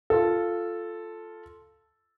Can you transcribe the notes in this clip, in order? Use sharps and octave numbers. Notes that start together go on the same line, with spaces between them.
F4 A4